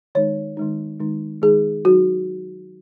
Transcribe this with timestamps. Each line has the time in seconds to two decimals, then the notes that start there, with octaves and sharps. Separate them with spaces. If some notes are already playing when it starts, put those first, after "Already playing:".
0.15 D#3 G#3 D#4 C#5
0.57 D#3 G#3 D#4
1.00 D#3 G#3 D#4
1.42 D#3 G#3 D#4 G#4
1.85 F#3 D#4 F#4